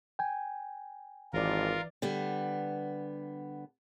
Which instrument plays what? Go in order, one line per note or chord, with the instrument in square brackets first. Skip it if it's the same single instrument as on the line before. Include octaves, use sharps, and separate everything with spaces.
[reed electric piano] G5 G#5
[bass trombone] G#1 [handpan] E3 D5 [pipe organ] F4 A#4
[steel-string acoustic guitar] D3 G3 B3